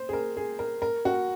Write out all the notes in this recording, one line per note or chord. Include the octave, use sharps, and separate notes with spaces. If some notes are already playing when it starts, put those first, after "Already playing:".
Already playing: C5
G#4
A#4
G#4
A#4
A#4
F#4